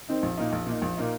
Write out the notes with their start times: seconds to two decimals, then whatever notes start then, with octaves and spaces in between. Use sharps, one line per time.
0.09 D#3 C4 D#4
0.23 A#1
0.37 A#2 A#3 D#4
0.52 A#1
0.66 A#2 A#3 D#4
0.82 A#1
0.97 A#2 A#3 D#4